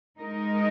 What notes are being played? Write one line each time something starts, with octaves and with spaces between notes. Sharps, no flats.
G#3 D#4 A#4 D#5